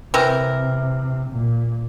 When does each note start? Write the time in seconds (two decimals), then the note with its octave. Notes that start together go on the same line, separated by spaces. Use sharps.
0.14 C3 E3 C4 A#4
1.31 A#2